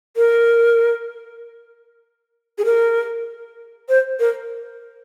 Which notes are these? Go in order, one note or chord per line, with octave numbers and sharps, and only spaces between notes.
A#4
G#4
A#4
C5
A#4